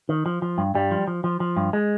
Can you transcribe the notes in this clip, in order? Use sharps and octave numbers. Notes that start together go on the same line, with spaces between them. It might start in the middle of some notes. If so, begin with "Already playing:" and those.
D#3
F3
F3
G2
G2 G3
F3
F3
F3
F3
G2
G#3